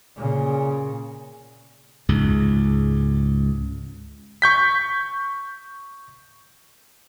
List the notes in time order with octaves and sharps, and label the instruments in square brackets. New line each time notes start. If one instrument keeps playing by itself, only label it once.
[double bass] A#2 C#3
[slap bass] C#2 G#2
[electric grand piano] C#6 G6 B6